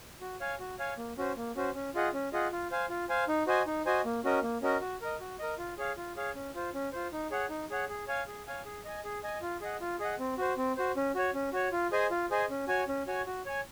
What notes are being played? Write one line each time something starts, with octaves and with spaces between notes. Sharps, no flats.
F#4
C#5 F5 G#5
F#4
C#5 F5 G#5
A#3
C#4 F#4 C5
A#3
C#4 F#4 C5
C#4
F4 G#4 D#5 F#5
C#4
F4 G#4 D#5 F#5
F4
C5 F5 G#5
F4
C5 F5 G#5
D#4
F#4 C5 D#5 G#5
D#4
F#4 C5 D#5 G#5
A#3
C#4 F#4 A#4 D#5
A#3
C#4 F#4 A#4 D#5
F#4
A#4 D#5
F#4
A#4 D#5
F4
G#4 C#5 F5
F4
G#4 C#5 F5
C#4
F4 C5
C#4
F4 C5
D#4
G#4 C#5 F#5
D#4
G#4 C#5 F#5
G#4
C#5 F5 G#5
G#4
C#5 F5 G#5
G#4
D#5 G#5
G#4
D#5 G#5
F4
G#4 D#5 F#5
F4
G#4 D#5 F#5
C4
F#4 C5
C4
F#4 C5
C#4
F#4 C#5
C#4
F#4 C#5
F4
G#4 C5 D#5 G#5
F4
G#4 C5 D#5 G#5
C#4
F#4 C#5 G#5
C#4
F#4 C#5 G#5
F#4
C#5 G#5